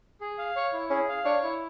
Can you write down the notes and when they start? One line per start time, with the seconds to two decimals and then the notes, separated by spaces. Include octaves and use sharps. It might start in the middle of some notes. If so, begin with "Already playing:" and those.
0.21 G#4
0.39 F5
0.56 C#5
0.73 E4
0.90 C#4 G#4
1.09 F5
1.25 D4 C#5
1.43 E4